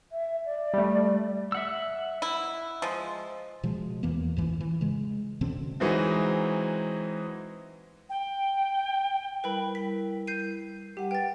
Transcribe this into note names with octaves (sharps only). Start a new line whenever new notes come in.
E5
D5
G3 A3
E5 F#5 E6
E4
F3 G#3
B2 F3 G#3
E2 E3 A#3 B3
A1 G#2 E3
E3
C#3 G#3
B2 D3 C4 C#4
E3 F#3 G#3 C4 D#4 F#4
G5
G3 E4 A#4 B4 G5 B5
B6
G6 C7 D#7
G3 G4 F#5
B4 G5 A6